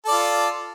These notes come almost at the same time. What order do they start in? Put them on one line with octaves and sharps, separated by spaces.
A4 D5 F4